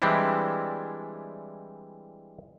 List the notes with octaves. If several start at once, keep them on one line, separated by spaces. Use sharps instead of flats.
E3 G3 G#3 C4 D4 E4